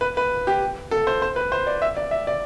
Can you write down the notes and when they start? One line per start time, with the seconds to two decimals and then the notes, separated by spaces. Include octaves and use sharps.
0.01 B4
0.17 B4
0.47 G4
0.91 A4
1.07 C5
1.22 C5
1.36 B4
1.52 C5
1.67 D5
1.82 E5
1.97 D5
2.11 E5
2.27 D5